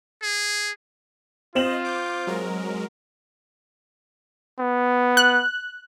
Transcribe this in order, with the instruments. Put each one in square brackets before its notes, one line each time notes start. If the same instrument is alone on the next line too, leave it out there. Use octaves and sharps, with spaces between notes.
[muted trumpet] G#4
[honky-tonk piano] C4 E7 F#7 [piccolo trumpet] F4 [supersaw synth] C5 D#5
[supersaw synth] D6 G6
F#3 G#3 A#4
[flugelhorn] B3
[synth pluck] F#6